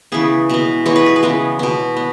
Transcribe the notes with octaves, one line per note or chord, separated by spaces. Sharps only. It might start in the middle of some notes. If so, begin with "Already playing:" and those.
C#3 E3 B3 G#4
B2 G#3 B3
E3 G#3 B3 C#5
B4
G#4
B4
C#3 E3 G#3 B3
B2 B3
B3